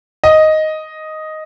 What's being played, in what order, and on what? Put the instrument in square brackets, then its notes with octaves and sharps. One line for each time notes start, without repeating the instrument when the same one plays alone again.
[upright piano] D#5